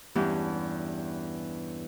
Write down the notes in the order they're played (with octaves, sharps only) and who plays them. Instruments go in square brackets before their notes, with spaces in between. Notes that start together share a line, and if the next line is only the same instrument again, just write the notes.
[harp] E2 G2 E3 C#4